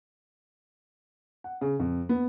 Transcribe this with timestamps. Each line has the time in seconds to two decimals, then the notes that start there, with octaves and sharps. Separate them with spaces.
1.44 F#5
1.61 C#3
1.80 F2
2.09 B3